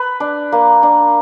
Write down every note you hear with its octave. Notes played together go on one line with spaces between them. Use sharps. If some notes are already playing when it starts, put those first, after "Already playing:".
Already playing: B4
D4
A#3
D4